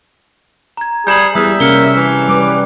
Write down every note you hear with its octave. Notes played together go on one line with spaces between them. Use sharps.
A#5 G#6
G3 G#4 G6 E7 F#7
E2 G3 G#4 E5 D#6
C3 A#3 C#4 F6 C#7 G7
E3
G3 B4 D6